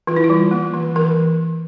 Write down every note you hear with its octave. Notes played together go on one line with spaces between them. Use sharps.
E3 F4
E4
F4
G3
A#3
E3
E3 A#4